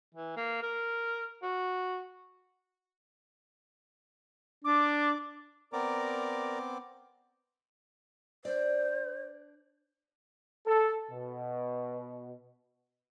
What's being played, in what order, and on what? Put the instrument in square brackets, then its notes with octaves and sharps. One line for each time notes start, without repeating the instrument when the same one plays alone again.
[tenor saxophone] E3
A#3
A#4
F#4
[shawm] D4 [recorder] D6
[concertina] B3 C4 D6 [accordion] A#4 D5 A#5
[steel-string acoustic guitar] D4 D5 [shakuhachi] C5
[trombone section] A4
B2